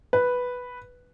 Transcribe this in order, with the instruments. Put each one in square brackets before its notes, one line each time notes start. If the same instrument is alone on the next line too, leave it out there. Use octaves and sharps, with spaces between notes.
[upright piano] B4